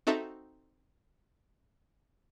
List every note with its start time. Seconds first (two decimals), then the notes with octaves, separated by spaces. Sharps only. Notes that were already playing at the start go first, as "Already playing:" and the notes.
0.07 C4 D#4 F#4 A4 E5